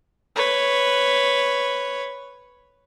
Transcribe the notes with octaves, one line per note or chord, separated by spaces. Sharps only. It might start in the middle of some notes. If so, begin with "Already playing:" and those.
B4 C#5